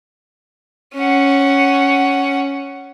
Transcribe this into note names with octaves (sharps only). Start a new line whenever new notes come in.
C#4 F#5